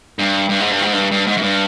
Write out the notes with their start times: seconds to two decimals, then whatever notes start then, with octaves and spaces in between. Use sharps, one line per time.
0.19 G2
0.49 G2
0.60 G#2
0.71 G2
0.82 G#2
0.93 G2
1.11 G2
1.27 G#2
1.37 F#2
1.42 G2